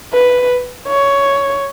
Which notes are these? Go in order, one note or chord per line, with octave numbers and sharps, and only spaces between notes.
B4
C#5